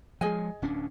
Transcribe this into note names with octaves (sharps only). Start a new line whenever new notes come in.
F3 G#3 G#4 D#5 G#5
D1 C#4 D4